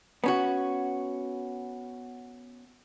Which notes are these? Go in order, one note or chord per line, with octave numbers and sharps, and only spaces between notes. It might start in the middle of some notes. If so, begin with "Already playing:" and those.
B3 C#4 F#4